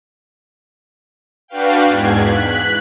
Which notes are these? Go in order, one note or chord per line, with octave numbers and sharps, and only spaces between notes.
D4 F#4 B4 F5 G5
E2 G#2 G#6
F#6 B6